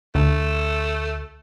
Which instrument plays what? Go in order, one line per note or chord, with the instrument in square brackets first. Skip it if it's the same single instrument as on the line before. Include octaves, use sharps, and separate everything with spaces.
[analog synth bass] D2 [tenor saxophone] A3